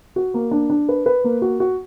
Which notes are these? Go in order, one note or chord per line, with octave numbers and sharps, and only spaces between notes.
F#4
A#3
D4
D4
B4
B4
A#3
F#4
F#4